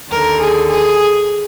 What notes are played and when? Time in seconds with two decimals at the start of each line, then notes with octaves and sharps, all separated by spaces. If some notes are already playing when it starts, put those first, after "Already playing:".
0.10 D#2 D3 A#4
0.41 G#4
0.71 G#4